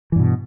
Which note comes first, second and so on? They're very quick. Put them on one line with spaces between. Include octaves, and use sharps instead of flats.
E3 G2 B2